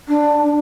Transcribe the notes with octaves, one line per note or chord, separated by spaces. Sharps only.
D4